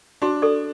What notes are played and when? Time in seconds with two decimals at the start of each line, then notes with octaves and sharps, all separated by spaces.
0.22 D4 F#4
0.42 A4 D5